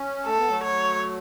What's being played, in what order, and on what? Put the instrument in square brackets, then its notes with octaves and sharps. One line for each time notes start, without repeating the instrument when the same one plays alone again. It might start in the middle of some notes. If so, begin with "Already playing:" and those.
Already playing: [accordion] C#4
[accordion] A3 [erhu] A4
[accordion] B3
F#3 A3
[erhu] C#5